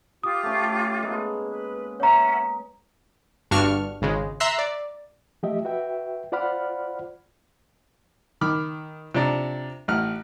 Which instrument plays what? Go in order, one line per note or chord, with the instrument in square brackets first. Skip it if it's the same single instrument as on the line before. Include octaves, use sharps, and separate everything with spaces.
[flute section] F4 G4 D6 [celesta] D#6
[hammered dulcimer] A3 C#4
G#3 A#3 B3
[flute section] B4
[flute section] C#4 E5 F#5 [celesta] C#5 A#5
[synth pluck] G1 G2 D4 F#4 C#6 F6
G#1 C#3 G#3
E5 A#5 C6 E6 F#6 C7
D5
[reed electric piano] F3 A3 G4 D#5 E5
F#4 B4 E5 G5
F4 C5 D5 F#5 B5 F6
[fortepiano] D#3 B5 D6 F6
C3 F3 D4 D5 A#5
A1 F#5 F6